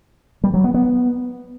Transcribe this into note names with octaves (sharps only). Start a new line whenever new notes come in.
G3
F#3
B3
B3